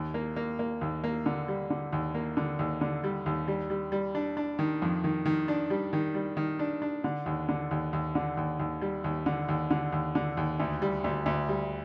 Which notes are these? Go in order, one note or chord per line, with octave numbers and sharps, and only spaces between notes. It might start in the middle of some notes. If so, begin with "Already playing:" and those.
Already playing: D#2
A#3
A#3
A#3
D#2
A#3
D3
G3
D3
D#2
A#3
D3
D#2
D3
G3
D#2
G3
G3
G3
D4
D4
D#3
F2
D#3
D#3
D4
G3
D#3
G3
D#3
D4
D4
D3
D#2
D3
D#2
D#2
D3
D#2
D#2
G3
D#2
D3
D#2
D3
D#2
D3
D#2
D2
G3
D2
D2
G3